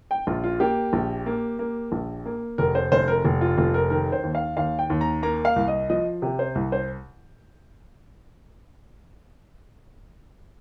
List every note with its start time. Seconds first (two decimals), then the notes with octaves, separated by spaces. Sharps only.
0.11 G5
0.27 A#1 F4
0.44 F4
0.60 A#3 G4
0.93 A#1
1.26 A#3
1.59 A#3
1.92 A#1
2.26 A#3
2.58 F1 A#4
2.75 C5
2.92 F1 C5
3.08 A#4
3.25 F1
3.41 F4
3.58 F1 F4
3.74 A#4
3.90 D#3 A#4
4.12 C5
4.23 D#2
4.35 F5
4.57 D#2 F5
4.79 G5
4.90 D#2
5.01 A#5
5.23 A#3 A#5
5.45 F5
5.56 C2
5.68 D#5
5.90 F3 D#5
6.22 C3 G4
6.39 C5
6.55 C2
6.72 C5